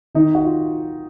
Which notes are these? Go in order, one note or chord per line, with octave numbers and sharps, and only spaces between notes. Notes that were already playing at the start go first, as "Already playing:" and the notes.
D#3 D#4
F#4
F4